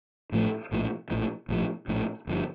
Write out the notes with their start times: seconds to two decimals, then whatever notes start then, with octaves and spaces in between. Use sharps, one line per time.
0.32 A1 A2 F3 A3
0.72 A#1 A2 F3
1.10 A#1 A2 F3
1.49 A#1 A2 F3
1.88 A#1 A2 F3
2.27 G1 G2 F3